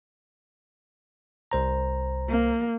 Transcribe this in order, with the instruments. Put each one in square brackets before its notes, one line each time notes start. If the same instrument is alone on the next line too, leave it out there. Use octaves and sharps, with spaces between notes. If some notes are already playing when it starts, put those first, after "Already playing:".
[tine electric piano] C2 C5 A#5
[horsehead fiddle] A#3